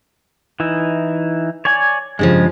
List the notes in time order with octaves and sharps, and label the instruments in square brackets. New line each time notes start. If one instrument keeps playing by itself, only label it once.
[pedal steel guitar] E3 D#4 E4
C#5 D5 G#5
[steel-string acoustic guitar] G2 C#3 F3 [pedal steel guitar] G#3